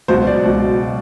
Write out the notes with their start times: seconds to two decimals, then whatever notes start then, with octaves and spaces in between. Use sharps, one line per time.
0.08 C#2 B2 F#3 C5
0.27 D5
0.45 C#2 B2 F#3